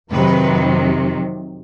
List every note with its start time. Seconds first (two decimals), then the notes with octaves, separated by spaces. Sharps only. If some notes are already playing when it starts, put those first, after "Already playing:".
0.11 F2 C3 D#3 F#3 B4